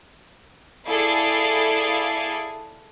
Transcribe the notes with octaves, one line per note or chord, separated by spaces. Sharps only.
E4 G#4 A4 D5 F5